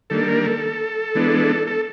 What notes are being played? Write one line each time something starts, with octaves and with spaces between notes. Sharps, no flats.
D#3 G3 A#3 D4 A4
A#4
A4
E3 G#3 B3 D4
A4